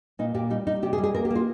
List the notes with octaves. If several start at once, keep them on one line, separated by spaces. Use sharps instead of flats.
A#2 D#4
A#2 G4
G3 D#4
G3 D#4
C3 G4
G#4
G3
G#4
A#3 A#4
G4
A#3
F4